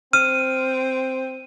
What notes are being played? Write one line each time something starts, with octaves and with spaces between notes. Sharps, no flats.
C4 F6 D#7